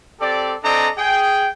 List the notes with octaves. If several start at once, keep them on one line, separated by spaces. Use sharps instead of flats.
C4 G4 A4 D5
C4 D4 A4 D5 D#5 A#5
G#4 G5